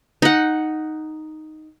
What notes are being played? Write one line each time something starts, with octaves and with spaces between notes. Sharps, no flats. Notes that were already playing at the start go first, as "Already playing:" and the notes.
D#4 F#5